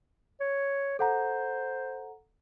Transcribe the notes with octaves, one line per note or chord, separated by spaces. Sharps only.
C#5
A4 C5 F#5 A#5